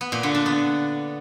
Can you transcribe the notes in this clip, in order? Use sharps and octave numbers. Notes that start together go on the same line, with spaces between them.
B3
A#2
D3
D4
B3